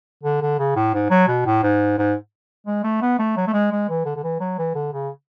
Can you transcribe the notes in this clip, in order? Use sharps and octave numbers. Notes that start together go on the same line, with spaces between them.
D3
D3
C#3
A2
G#2
F#3
B2
A2
G#2
G#2
G#3
A3
B3
A3
F#3
A3
G#3
G#3
E3
D3
D3
E3
F#3
E3
D3
C#3